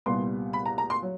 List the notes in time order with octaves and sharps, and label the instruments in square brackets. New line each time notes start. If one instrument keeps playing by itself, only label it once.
[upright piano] C2 A#2 G3 B3 C6
B5
A#5
A#5
C6
F#3